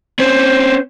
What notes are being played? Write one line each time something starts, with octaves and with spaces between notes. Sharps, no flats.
C4 C#4 C5